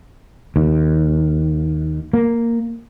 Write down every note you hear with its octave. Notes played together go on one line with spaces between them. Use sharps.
D#2
A#3